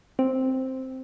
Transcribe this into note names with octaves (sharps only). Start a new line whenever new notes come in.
C4